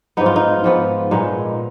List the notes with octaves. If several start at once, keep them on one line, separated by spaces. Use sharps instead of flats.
G#2 F3 B3 D#4
F4
D#4
G#2 F3 B3
A#2 G#3 B3 D#4